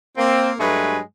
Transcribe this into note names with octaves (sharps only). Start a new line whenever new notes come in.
A#3 C4
G2 F#3 G#3 A3 B4 G#5